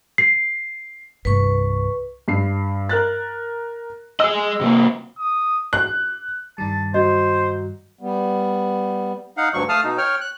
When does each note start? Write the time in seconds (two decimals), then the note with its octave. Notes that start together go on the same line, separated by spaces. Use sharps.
0.18 C7
1.25 C2 G2 B4 C#6
2.28 G2 C7
2.89 A#4 F#6 A6
4.20 G#4 D#5 E6
4.61 C3 A#3
5.19 D#6
5.73 F#6
6.58 G2 D#3 G3 A5
6.94 F#3 F#4 C5 D#5
8.01 G3 B3
9.37 D#4 F5 F#5
9.54 D2 G2 F#3 C#6
9.69 A3 F5 A5 D#6 F6
9.84 B2 D#4
9.98 C#5 G5 F6
10.21 F#6